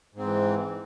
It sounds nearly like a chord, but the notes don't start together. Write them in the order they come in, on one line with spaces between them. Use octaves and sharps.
G#2 C4 E3